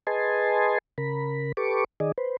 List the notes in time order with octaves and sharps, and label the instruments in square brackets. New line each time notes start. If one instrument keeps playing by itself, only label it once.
[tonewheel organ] G#4 B4 D#5 G#5 A5 C6
C#3 A#4 B5
G4 A4 B4 C#6 D6
D#3 G#4 D5 D#5
B4 C5